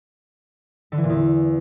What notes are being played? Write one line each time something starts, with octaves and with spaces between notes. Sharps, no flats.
D3
E3
A#2
E2